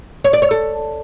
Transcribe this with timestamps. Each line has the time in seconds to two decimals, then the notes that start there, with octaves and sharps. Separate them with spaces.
0.24 C#5
0.33 D5
0.42 C#5
0.51 A4